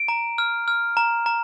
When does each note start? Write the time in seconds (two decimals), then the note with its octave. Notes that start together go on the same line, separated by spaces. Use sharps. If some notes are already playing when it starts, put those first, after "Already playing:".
Already playing: D7
0.08 A#5
0.38 F6
0.68 F6
0.97 A#5
1.26 A#5